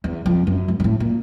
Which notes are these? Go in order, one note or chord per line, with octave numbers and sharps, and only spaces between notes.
E2
F2
F#2
G#2
G#2
A2
A#2